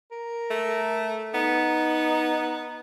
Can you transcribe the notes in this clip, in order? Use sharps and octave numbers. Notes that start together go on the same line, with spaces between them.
A#4
A3
B3 D#4